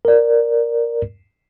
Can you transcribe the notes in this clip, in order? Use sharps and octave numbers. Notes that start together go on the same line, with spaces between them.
A#4 D5